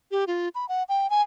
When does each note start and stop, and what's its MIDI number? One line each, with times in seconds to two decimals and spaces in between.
0.11 0.25 67
0.27 0.49 65
0.55 0.66 83
0.69 0.83 78
0.89 1.10 79
1.10 1.22 80